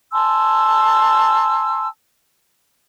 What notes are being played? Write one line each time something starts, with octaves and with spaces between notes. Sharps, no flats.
G#5 A5 C6 E6